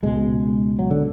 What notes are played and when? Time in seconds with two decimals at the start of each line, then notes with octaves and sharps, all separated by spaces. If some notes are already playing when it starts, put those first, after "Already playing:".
0.03 C#2 B2 G#3
0.79 F#3
0.91 D3